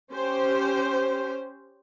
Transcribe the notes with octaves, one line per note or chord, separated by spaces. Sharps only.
C#4 G4 C5